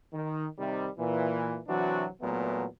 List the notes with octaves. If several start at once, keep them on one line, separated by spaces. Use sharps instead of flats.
D#3
C3 D#3 G3
A#2 E3
C3 E3 F#3 C4 D4 F#4
E2 A#2 F#3 A3 B3